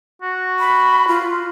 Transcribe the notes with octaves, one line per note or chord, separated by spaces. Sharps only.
F#4
B5
F4